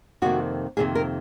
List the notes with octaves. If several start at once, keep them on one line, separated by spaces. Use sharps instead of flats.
F2 C3 D#3 A#3 F#4
F2 C3 D#3 A#3 G#4
A#4